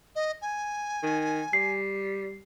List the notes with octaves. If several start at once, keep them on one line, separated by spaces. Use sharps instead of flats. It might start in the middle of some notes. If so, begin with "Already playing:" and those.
D#5
G#5
D#3
G3 C7